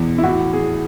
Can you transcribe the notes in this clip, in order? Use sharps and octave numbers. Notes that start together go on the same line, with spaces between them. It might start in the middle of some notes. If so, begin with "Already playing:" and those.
Already playing: E2 B2
E4
A2 F#4
G#4